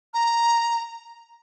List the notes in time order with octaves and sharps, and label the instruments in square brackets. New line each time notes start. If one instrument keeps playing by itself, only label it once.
[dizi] A#5